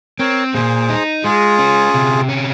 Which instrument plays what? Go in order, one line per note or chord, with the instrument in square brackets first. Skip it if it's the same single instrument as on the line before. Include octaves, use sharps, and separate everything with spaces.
[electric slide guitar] C4 [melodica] A#4 C#5
[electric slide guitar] A#2 [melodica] G#4 C5
[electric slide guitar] D#4
[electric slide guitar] G#3 [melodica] F4 G#4
[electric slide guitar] C#4
C3
C#4